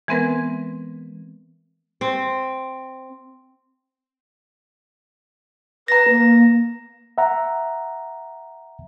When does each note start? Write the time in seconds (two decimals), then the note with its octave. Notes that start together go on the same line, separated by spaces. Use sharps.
0.08 E3 G#3 B3 C4 A#4 B4
2.01 C4
5.88 B4 A#5 A#6
6.09 A#3
7.18 E5 F#5 A#5